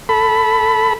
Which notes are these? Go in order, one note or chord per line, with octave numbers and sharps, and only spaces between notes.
A4 B5